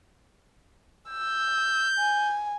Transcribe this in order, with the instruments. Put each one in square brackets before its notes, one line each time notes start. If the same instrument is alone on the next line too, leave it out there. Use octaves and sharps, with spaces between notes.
[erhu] E6 [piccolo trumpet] G6
[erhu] G#5